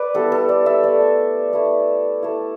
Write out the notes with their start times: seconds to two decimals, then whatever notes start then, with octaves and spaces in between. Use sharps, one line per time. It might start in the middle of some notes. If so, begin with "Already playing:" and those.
Already playing: B4 D5
0.14 G3 B3 E4 A4
0.32 A4
0.49 D5
0.66 E5
0.84 A3 E4 D5
1.53 A3 E4
2.23 A3 E4